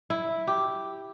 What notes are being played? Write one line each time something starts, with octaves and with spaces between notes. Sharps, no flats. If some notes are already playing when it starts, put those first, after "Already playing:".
E4
G4